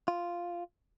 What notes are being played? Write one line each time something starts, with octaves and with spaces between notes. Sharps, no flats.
F4